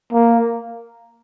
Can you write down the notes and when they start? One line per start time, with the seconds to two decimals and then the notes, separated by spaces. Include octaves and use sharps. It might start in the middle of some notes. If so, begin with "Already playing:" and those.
0.13 A#3